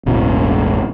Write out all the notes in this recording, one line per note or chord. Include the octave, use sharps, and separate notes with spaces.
E1 A1 B2